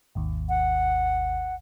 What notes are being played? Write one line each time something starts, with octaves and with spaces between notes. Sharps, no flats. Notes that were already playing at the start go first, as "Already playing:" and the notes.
G#1 D#2
F#5